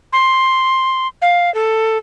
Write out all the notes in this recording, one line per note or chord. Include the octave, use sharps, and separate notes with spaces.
C6
F5
A4